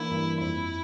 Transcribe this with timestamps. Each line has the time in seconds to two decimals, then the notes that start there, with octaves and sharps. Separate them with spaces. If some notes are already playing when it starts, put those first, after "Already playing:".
Already playing: E3 A#3 D4 E4
0.11 G2
0.40 F2 E4